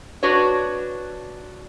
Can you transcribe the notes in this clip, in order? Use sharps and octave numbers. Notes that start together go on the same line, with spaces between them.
D4 F#4 B4 C#5